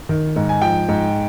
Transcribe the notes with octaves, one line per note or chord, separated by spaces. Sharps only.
D#3
G#2
G#5
F3 G5
G#2